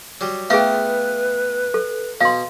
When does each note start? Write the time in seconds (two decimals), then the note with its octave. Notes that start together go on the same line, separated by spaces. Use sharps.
0.21 F#3 G3
0.50 A3 B3 F4 G#4 B4 E5 F5 G5
1.74 A4
2.21 B2 F5 C6